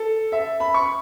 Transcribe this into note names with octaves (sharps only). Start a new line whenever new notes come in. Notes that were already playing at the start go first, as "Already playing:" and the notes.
Already playing: A4
E5
B5
C#6